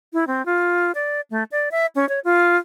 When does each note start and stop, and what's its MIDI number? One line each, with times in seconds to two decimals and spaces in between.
0.13 0.25 64
0.27 0.45 60
0.46 0.92 65
0.95 1.21 74
1.30 1.43 57
1.52 1.69 74
1.71 1.86 76
1.95 2.07 61
2.09 2.20 73
2.24 2.57 65